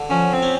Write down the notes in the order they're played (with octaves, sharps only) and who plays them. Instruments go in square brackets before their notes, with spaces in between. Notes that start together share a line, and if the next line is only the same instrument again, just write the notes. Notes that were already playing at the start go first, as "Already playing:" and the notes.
Already playing: [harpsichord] D3
[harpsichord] F3 [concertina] C#4
[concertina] C4
[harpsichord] C#4